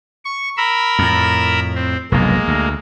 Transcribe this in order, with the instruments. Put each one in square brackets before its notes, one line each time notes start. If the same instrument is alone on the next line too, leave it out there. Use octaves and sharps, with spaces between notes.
[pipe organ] C#6
A#4 B5 E6
[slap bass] F2 A2
[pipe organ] C4
[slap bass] F1 B1 G2 [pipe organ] G#3 A#3
[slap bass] D2